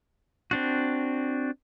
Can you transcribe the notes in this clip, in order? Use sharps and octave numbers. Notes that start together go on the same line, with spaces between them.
C4 D4 F#4